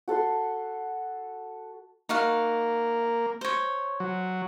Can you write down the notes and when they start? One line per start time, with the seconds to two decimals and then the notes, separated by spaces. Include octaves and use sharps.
0.08 F#4 A4 F#5 C6
2.09 A#3 D#4 F#4 F5
3.41 C5 C#5
4.00 F#3